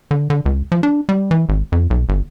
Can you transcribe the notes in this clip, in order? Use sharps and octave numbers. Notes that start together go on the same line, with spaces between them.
D3
D3
C#2
F3
D4
G3
E3
G#1
F2
B1
G1